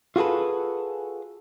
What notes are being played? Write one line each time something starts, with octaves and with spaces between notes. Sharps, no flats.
F4 F#4 G#4 A4 B4